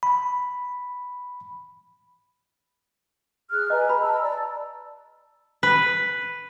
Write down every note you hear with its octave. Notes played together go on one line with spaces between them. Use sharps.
B5
G#4 F6 F#6
B4 D#5 G#5 A#5
B5
A5 A#5 E6
D5
B4